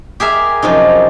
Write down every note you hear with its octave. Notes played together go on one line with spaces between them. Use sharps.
G4 G#4 A#4 E5
F#2 C3 F3 D#4